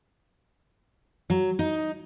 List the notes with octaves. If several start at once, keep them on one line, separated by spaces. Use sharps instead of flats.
F#3
D#4